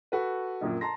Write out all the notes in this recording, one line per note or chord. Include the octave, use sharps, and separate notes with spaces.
F#4 A4 B4
A#1 F#2 A#2
A5 A#5 C6 A#6